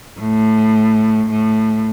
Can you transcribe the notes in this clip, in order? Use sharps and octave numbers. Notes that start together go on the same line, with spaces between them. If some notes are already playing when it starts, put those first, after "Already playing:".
A2
A2